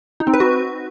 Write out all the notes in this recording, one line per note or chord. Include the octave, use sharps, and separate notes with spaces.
D#4
C4
B4
F#4